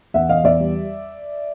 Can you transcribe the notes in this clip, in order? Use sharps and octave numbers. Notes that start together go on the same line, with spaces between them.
E2 E5 F#5
E2 D#5 F5
E2 D5 E5
G3